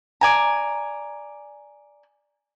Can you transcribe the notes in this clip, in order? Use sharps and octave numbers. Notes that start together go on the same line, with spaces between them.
D5 G#5 A#5